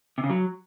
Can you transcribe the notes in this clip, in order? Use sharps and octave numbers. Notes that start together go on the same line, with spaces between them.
C3
C#3
F#3